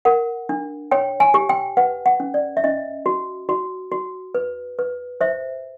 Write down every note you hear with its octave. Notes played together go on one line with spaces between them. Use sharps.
A#4 F#5
D4
C#5 G5
G#5
G4
G5
B4 F#5
F#5
C#4
D5
E5
C#4 D#5
F#4
F#4
F#4
B4
B4
C5 E5